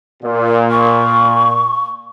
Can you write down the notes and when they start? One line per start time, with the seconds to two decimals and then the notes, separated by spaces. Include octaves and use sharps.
0.23 A#2
0.71 C#6